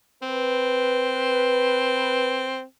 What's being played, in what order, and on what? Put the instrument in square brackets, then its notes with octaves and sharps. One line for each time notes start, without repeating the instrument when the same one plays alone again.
[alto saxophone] C4 [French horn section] B4